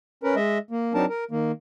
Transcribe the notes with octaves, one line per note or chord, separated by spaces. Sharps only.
C#4 A#4 B4
G#3 D#5 E5
A#3
F#3 C4 D4 D#4 A#4 A5
A#4
D#3 A#3